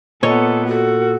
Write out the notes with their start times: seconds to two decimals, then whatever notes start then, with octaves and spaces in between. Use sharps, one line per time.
0.23 A#2 B3 A4 C#5 D#5
0.68 F#4 A4